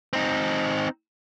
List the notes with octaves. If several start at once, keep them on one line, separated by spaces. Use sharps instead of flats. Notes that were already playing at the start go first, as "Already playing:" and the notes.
C4 D#4